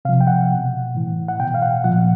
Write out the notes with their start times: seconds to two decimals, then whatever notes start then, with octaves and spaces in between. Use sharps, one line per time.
0.05 C3 F5
0.09 F3
0.21 G5
0.27 F#5
0.51 B2
0.95 A2 E3
1.28 F#5
1.40 B2 G5
1.54 F5
1.62 F#5
1.84 A#2 F3 F#5